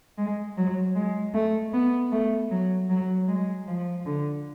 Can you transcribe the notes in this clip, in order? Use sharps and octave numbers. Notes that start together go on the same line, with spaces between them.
G#3
F#3
G#3
A3
B3
A3
F#3
F#3
G#3
F3
D3